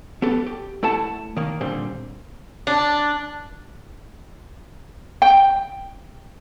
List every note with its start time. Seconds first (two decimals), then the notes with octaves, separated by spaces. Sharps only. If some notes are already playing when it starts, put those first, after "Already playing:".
0.22 B3 G4 A4
0.46 G4
0.83 A3 E4 A4 F#5 A5
1.36 D#3 A#3
1.61 A#2 D3 G3 C4
2.67 D4
5.22 G5